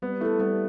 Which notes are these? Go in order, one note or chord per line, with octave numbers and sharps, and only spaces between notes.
G3 B3
A3 E4 A4
G3 B3